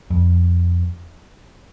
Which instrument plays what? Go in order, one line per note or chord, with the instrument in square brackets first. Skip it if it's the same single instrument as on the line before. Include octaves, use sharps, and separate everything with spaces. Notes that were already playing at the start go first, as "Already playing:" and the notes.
[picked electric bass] F2